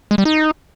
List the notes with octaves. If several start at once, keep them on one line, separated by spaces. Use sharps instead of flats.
G#3
G3
D#4